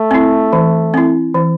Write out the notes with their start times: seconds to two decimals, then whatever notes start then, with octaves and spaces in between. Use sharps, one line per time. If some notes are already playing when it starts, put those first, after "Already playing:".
Already playing: A3
0.11 C4 E4
0.53 E3
0.94 C4 E4
1.34 E3